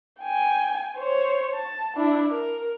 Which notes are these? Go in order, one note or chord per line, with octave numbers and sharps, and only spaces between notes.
G5 G#5
C5 C#5
A5
D4 E4
A#4